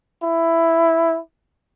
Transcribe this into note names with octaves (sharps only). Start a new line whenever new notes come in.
E4